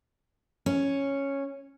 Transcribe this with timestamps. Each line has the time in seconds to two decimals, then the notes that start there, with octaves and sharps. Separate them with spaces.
0.66 C#4